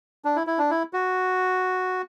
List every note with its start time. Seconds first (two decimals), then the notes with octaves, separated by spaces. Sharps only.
0.25 D4
0.36 E4
0.47 E4
0.59 D4
0.71 E4
0.93 F#4